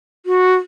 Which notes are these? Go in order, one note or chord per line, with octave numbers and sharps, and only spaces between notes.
F#4